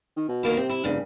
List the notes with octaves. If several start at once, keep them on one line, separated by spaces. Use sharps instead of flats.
D#3
B2
D#3 A#3 E4
C3 C4
E4
F1 G2 C#3